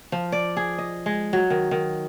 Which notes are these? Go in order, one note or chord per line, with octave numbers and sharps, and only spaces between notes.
F3
D5
G#4
D#5
G#3
F#3
D#3
D#3